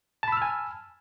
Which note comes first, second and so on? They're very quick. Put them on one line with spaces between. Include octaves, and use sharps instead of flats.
A5 B5 E6 F6 G#5